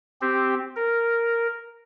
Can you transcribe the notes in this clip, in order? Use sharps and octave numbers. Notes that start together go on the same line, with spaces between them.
C4 G4
A#4